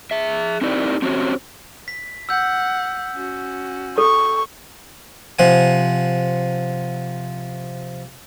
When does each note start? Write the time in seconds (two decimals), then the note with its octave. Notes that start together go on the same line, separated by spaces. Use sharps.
0.11 G#4 E5
0.61 C4 D#4 E4 G4 A#4 D5
1.02 C4 C#4 F#4 G4 C5 C#5
1.88 B6
2.29 F#5 E6 G6
3.15 C#4 F#4
3.98 A4 C#6
5.39 C3 F3 F#5 G#5